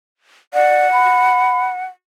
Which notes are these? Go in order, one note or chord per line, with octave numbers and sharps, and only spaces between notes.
D5 F#5
B5